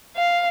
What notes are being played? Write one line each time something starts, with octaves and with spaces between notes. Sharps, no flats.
F5